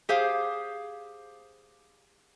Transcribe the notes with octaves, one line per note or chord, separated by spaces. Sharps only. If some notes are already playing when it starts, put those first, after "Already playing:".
G4 G#4 C5 F5